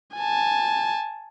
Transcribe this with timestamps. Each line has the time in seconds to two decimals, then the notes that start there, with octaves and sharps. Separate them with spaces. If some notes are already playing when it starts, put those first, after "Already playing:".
0.15 G#5 A5